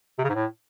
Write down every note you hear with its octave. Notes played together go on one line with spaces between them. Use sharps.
C3
C#3
G#2
A2